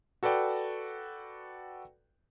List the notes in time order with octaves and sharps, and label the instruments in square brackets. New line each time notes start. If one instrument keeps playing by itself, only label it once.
[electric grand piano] F#4 A4 B4 D5 G5